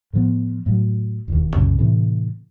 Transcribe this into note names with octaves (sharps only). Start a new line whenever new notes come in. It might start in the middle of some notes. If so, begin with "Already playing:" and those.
A2 F3 B3
A2 F#3
E1 D#2
C2 F#2 A#2 C#3
A2 C3 E3